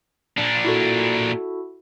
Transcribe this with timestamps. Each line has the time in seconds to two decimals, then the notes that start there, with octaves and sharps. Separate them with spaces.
0.38 A#2 D4
0.64 E4 F#4 A4